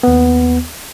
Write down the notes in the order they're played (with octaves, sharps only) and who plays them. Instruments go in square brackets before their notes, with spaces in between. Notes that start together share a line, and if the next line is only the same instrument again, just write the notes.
[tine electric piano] D#2 B3